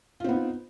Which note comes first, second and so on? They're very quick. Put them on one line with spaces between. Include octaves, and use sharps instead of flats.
F4 C4 B3 D#4